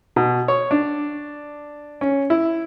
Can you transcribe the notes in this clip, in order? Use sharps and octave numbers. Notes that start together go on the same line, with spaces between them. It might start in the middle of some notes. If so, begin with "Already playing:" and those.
B2
C#5
D4
C#4
E4